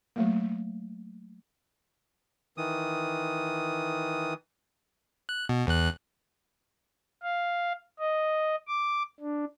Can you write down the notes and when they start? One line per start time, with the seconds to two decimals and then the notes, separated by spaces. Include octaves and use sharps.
0.16 F#3 A3 A#3
2.57 D#3 E3 D#6
5.29 F#6
5.49 B2
5.67 E2 F#6
7.22 F5
7.99 D#5
8.67 D6
9.20 D4